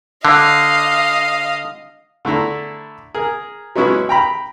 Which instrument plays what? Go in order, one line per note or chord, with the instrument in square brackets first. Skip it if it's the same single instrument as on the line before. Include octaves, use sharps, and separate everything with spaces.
[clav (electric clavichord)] D3 [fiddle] D#5 F5
[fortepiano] D3 A3 E4 A#5
G#4 A#4
F#3 G#3 B3 C#4 E4 F#4
G5 A#5 B5